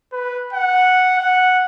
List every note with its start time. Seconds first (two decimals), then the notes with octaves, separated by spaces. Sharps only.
0.12 B4
0.53 F#5
1.19 F#5